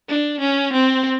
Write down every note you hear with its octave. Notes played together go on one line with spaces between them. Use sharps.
D4
C#4
C4